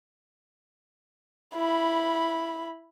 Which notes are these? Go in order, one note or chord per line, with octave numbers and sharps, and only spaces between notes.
E4 B5